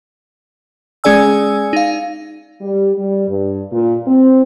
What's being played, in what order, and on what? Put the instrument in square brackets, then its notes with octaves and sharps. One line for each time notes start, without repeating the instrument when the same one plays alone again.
[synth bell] G#3 C#4 G#4 D5 G#5 E6
D#4 F5
[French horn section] G3
G3
G2
A#2
C4